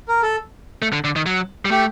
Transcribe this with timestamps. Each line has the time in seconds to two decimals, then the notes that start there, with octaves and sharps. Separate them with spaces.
0.08 A#4
0.23 A4
0.82 A3
0.93 D3
1.04 D3
1.16 D#3
1.26 F#3
1.65 G3
1.71 A3 G4